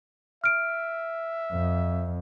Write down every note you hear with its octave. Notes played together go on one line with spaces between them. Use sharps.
E5 F6 D7
F2